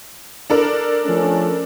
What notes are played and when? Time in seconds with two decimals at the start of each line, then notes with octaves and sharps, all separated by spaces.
0.50 D4 A4 A#4
1.05 F3 A3 C#4